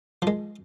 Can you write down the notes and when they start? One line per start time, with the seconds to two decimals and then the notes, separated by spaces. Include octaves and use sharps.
0.22 F3 G#3